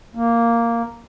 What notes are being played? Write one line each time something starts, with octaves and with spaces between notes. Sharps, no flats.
A#3